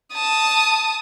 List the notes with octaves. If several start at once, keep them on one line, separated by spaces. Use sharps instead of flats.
A5 D#6